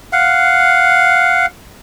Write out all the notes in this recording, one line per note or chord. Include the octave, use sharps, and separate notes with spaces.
F5 F#5